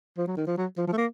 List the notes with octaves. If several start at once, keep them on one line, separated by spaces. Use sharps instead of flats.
F3
F#3
D#3
F3
F#3
F3
F3
A3
A#3